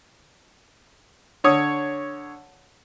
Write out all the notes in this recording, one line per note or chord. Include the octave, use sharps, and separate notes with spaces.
D3 C#5 D#6